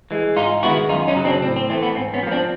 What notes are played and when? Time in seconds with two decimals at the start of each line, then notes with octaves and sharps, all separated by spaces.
0.11 E3 G#3
0.36 G#2 D#4 F4
0.63 D#3 G#3 B3 E4 F#4
0.89 F#2 D#4 F4
1.07 C#4 D#4
1.16 C#3 F#3
1.25 C4 D4
1.42 A2 C4
1.56 C4
1.69 E3 A3 C4
1.83 B3
1.95 G#2 C4
2.14 B3 C#4
2.23 F3 A#3
2.31 C4 D4